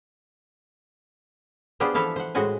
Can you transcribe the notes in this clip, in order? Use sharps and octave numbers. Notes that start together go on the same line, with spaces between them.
B3 D4 F4 G4 G#4 C5
E3 F3 E4 A4 F5 A5
C5 F#5
A2 G#3 F#4 C5 G#5